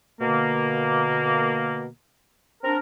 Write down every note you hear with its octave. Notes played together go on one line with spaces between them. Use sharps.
B2 D3 A#3
C4 D4 A#4